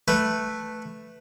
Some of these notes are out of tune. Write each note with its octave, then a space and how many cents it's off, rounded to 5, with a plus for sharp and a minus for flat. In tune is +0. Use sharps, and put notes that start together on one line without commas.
A3 +0 B4 +0